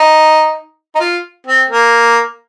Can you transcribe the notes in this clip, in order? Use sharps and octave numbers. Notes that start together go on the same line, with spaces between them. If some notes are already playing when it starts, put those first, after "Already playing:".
Already playing: D#4
D#4
F4
C4
A#3